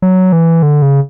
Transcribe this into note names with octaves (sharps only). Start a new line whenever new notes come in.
F#3
E3
D3
C#3